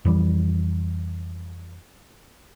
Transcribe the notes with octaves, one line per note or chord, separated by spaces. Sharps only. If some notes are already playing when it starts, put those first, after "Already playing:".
F2 E3 G3